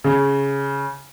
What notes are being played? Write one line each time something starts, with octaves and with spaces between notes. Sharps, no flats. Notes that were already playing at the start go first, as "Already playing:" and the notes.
C#3